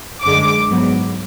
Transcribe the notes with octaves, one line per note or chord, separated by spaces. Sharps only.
F#2 D3 G#3 D6
G#2 F#3 B3